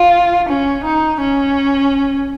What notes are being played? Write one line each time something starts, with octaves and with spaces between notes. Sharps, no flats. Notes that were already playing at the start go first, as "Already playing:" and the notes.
Already playing: F4
C#4
D#4
C#4